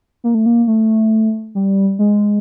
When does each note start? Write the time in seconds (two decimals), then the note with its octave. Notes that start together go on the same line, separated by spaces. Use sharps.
0.24 A#3
0.35 A3
0.46 A#3
0.67 A3
1.55 G3
1.99 G#3